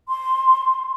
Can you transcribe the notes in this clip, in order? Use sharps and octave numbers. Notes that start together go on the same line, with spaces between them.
C6